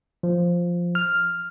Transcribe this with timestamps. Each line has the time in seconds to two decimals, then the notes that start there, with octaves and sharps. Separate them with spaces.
0.23 F3
0.95 F6